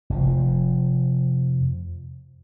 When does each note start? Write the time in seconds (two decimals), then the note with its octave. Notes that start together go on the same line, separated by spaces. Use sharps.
0.10 F1 F3